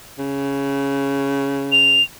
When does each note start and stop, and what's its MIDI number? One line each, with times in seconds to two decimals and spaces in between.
0.19 2.00 49
1.72 2.03 101